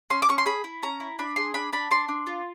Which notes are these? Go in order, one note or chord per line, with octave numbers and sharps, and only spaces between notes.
C#4 C6
D6
C#4 C#6
C6
G#4 B5
E4
C#4 A#5
E4
D4 B5
G#4 C6
D4 B5
D4 B5
D4 C6
D4
F4